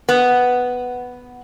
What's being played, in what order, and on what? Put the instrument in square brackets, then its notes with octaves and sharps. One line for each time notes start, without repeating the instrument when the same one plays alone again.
[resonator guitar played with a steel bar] B3